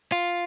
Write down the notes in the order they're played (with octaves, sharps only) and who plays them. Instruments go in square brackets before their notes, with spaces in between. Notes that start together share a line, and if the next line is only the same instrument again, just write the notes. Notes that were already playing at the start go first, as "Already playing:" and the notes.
[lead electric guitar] F4